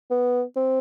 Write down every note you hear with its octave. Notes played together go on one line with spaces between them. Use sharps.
B3
C4